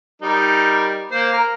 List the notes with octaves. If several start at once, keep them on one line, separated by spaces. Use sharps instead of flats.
G3 D#4 A#4
A#3 C5
A#4